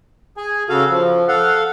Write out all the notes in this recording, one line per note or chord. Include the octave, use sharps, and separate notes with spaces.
G#4 G#5
C#3 F#4 A4 F5
F3
A4 F5 F#5